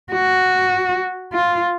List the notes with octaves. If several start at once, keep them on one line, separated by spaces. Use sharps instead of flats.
F#4
F4